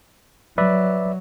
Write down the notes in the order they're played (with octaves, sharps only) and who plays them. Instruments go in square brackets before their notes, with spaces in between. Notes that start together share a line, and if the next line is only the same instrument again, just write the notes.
[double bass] F#3 [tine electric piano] B4 D5 E5